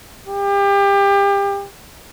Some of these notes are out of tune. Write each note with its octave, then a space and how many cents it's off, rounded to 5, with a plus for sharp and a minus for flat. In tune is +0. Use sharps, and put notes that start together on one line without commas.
G4 +30